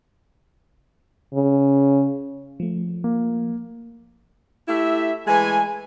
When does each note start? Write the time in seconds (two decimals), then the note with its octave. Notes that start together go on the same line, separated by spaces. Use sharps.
1.34 C#3
2.60 F3 A3
3.04 A#3
4.68 A3 E4 G4 E5
5.27 E3 G#3 A3 G#5